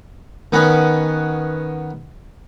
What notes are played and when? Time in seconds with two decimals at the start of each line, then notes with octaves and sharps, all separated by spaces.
0.52 D#3 B3 C#4 B4